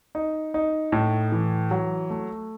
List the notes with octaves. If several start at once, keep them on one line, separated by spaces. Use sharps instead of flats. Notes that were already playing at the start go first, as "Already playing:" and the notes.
D#4
D#4
A2
E3
F#3
A3